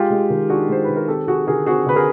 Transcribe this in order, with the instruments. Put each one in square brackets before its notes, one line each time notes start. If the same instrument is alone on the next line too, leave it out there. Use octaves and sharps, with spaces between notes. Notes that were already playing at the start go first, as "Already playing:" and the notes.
Already playing: [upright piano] G#3 F4 G4
G#3
D#3
D4 F#4 G#4
G#3 C5
D#3 B4
A#4
C4 G4 A4
C4 F#4 G#4
D3 G#4 A#4
C4 F#4 G#4
D3 B4
G#4 A#4